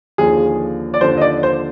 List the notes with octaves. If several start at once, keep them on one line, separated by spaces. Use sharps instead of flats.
D#2 D3 F3 G#4
D5
D#2 D3 F3 C5
D#5
D5
C5